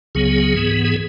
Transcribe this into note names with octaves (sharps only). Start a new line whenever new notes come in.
C#2 C#3 F#3 B3 G#4
G#2 E3 B3
G#4